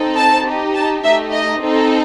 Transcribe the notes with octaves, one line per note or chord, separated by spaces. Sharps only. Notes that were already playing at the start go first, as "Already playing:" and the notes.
Already playing: C4 D#4 A4
A5
D#4 G4
A5
A3 D#4 G4 E5
D#5
C4 D#4 A4